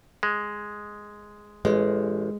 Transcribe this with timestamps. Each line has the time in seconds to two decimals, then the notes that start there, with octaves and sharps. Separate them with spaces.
0.23 G#3
1.65 A1 G#3